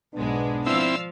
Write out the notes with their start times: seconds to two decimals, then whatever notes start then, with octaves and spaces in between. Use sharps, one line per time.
0.14 B1 G#2 B2 G#3 B3 D4
0.66 F3 C4 E4 D5 F5 E6